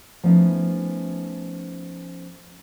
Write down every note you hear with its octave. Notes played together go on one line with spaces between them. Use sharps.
F3 A3 B3 C#4 D#4 E4